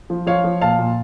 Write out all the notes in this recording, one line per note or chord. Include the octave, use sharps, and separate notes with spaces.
F3
F3 C#5 F5
F3
A#2 F5 A5
A#2